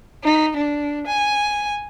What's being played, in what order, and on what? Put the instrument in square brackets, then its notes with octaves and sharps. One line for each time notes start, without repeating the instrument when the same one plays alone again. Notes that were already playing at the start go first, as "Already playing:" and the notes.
[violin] D#4
D4
G#5